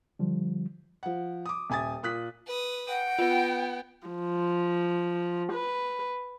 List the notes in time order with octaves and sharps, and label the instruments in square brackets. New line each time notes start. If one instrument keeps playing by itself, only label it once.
[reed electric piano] D3 F3 G3
[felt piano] F3 F#5
D6 D#6
D#1 E5 G#5 D#6 A6
A#2 D#6 F#6 B6
[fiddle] B4 D#6
[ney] F#5 [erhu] G5
[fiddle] B3 [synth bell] F4
[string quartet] F3
B4